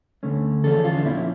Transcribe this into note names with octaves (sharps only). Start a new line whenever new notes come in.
D2 D3 A3 C#4
E2 D3 F3 C#4 A4
F4
D4
A#2 F3 C#4 E4